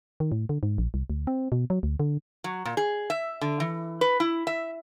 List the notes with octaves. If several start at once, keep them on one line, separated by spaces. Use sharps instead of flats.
D#3
A2
D3
G#2
A#1
C2
D2
C4
B2
F#3
D2
D3
F#3
A#2
G#4
E5
D3
E3
B4
E4
E5